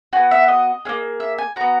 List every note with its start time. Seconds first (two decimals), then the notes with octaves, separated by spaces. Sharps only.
0.13 B3 F#4 G#5
0.31 E5
0.48 D#5
0.85 A#3 C#4 G#4
1.20 E5
1.38 G#5
1.56 B3 F#4 A#5